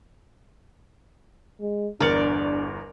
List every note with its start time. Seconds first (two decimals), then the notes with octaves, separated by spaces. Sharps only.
1.61 G#3
2.00 G1 E2 D4 A#4 D5 C#7